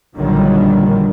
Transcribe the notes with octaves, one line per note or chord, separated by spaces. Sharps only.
A#1 A#2 D3 D#3 F#3 G3